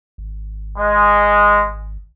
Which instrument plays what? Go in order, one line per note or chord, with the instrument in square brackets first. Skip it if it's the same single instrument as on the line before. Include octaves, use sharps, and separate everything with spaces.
[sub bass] G#1
[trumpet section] G#3